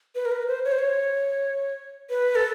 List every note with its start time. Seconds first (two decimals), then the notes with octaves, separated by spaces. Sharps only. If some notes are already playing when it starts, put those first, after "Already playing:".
0.15 B4
0.26 A#4
0.32 B4
0.48 C5
0.65 C#5
0.72 C5
0.79 C#5
2.10 B4
2.35 A4